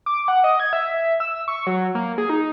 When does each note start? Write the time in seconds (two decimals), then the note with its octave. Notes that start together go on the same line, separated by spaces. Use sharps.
0.06 D6
0.28 F#5
0.44 D#5
0.60 G#6
0.73 E5
1.20 E6
1.48 C#6
1.67 F#3
1.95 A#3
2.18 G#4
2.30 D#4